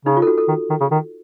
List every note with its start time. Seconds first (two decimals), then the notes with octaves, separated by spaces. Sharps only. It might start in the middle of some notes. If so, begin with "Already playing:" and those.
0.05 C#3 D#4
0.17 F4
0.22 A4
0.27 F#4
0.38 A4
0.48 D#3
0.70 D#3
0.81 C#3
0.91 D#3